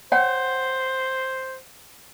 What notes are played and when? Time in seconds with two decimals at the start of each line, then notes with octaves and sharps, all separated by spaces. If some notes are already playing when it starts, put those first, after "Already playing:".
0.12 C5 C#5 F#5 G5